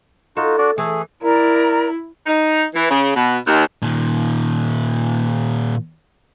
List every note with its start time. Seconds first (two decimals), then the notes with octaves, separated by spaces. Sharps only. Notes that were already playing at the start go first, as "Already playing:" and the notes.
0.37 D#4 F4 F#4 A4
0.58 D4 F#4 D5
0.78 E3 A3 G#4
1.23 E4 A#4 D5 A#5
2.26 D#4
2.74 E3
2.90 C#3
3.15 B2
3.47 D#2
3.82 A#2 D#3